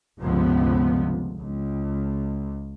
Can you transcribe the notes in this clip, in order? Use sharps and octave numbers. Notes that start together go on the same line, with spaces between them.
G1 C#2 C3 F3 B3
C#2